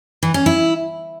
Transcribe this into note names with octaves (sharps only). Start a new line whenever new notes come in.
E3
C#4
E4